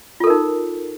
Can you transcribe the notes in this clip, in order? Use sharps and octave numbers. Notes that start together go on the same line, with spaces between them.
D#4 F4 A4 A#4